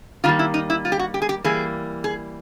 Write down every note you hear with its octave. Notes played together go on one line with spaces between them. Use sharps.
D#3 G3 A#3 F4
E4
D#4
E4
F4
G4
F#4
G4
G#4
G4
E3 G3 A#3 G#4
G#4